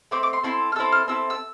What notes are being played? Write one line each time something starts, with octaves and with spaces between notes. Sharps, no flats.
A3 C4 D6
D6
C6
C4 E4 A4 C6
F6
C4 E4 A4 E6
F6
C4 E4 A4 E6
E6